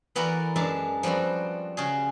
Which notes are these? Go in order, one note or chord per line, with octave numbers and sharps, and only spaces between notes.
E3 B3 F#4 A4 A#4 D5
F#2 G#3 D4 A#4 E5 A5
F3 G3 B3 C4 F#4
C#3 C#4 F#4 G#4